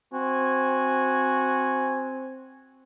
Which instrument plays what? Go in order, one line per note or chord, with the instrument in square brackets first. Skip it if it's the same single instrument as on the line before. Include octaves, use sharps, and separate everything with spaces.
[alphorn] C4 [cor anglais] F#4 [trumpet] G#5